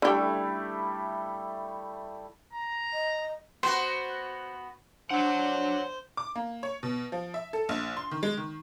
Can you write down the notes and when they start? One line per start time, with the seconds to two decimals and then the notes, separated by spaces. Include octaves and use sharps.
0.02 D3 G3 A3 E4 G4
2.53 A#5
2.94 D#5
3.63 B3 F#4 C5
5.10 D4 C5 C#5 F#5
6.17 D6
6.36 A#3
6.63 C#5
6.83 B2
7.12 F3
7.34 E5
7.53 A4
7.69 A#1
7.97 C6
8.11 D#3
8.23 G#3
8.37 D#3